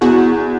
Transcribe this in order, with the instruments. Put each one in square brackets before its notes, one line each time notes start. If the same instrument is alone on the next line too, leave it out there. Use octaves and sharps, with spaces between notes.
[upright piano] E2 [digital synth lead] F#4